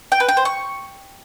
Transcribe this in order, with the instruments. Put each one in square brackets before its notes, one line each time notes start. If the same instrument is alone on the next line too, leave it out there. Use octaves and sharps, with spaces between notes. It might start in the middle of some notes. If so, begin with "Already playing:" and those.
[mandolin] G5
B4
G5
C5
C#6